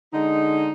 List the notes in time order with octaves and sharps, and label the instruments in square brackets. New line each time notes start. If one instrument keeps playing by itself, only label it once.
[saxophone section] D3 G#3 D#4